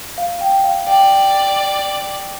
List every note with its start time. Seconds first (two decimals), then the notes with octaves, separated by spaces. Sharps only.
0.18 F5
0.41 G5
0.64 F5
0.87 D5 G5